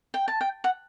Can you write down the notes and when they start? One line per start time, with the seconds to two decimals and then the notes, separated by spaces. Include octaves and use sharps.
0.14 G5
0.28 A5
0.41 G5
0.64 F#5